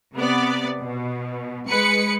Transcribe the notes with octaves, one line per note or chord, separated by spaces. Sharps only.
C3 B3 D5
B2
G#3 B4 C#7